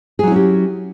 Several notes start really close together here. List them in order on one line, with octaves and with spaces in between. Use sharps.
G#4 F#3 E4 C#4 G4